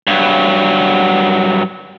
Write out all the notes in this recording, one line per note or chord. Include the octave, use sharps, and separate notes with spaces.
G2 F#3